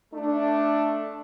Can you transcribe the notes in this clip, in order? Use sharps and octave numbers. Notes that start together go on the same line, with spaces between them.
A3 D4